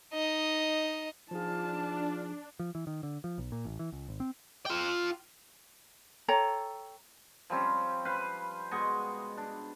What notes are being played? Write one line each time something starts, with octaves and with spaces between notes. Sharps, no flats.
D#4 D#5
F3 D4 D#4 F4 G#4 A5
F3
E3
D#3
D3
F3
B1
A#2
A1
E3
C#2
G#1
C4
F4 G5
A4 C#5 G5 A#5
F3 G3 C4 C#4
B4 C5 F5 B5
B2 G#3 D#5 C#6
D4